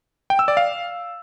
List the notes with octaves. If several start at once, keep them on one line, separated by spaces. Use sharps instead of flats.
G5
E6
D5
F5